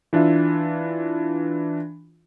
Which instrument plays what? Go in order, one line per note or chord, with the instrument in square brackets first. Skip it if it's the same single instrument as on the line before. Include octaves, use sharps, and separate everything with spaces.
[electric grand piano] E3 D4 F4 E5